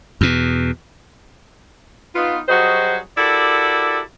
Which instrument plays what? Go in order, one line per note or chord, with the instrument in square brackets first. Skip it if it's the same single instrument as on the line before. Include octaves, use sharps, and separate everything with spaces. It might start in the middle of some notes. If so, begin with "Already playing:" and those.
[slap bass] E2 B2
[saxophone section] B3 D#4 F4
F#3 G3 F#4 G#4 C5 D#5
E4 F#4 G4 A4 A#4 D5